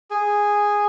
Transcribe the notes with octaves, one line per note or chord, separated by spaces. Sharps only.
G#4